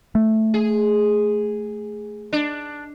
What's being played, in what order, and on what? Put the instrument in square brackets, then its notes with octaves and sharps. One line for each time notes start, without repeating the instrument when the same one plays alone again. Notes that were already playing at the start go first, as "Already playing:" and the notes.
[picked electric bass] A3
[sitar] G#4
D4